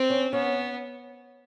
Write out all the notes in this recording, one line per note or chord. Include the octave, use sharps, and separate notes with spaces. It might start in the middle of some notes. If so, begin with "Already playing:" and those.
Already playing: C4
C#4
B3 C#4